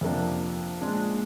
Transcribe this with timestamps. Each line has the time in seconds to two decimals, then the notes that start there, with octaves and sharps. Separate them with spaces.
0.01 F2 C3 F3 A#3 D4
0.80 A#2 G#3 D4 G#4